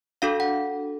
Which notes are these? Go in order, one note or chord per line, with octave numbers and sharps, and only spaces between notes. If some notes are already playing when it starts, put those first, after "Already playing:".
D4 F#4 A4 F5
F#5